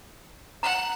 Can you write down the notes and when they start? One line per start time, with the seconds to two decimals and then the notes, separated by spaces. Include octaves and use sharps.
0.63 F#5 A#5